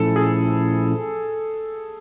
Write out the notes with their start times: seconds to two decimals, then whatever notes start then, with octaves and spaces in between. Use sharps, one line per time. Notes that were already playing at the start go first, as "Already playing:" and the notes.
Already playing: A#2 F3 A3 C#4 E4 A4
0.16 G#4